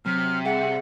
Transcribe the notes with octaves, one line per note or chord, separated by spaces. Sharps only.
C3 F#3 F6
G3 G#4 E5 F#5